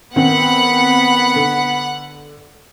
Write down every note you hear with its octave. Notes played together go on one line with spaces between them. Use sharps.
D#3 B3 C4 F#5 B5
D3